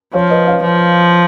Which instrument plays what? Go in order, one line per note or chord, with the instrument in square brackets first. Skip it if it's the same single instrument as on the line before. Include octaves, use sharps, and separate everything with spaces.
[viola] F3 [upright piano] C#5 F5
[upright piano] B4 D#5
C#5 F5
[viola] F3